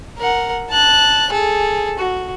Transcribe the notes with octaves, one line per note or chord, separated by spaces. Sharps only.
A#4 F#5
A5 F#6
G#4 A4
F#4